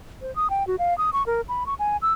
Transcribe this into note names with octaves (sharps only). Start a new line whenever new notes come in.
C5
D#6
G5
F#4
F5
D#6
C#6
A#4
B5
C#6
G#5
E6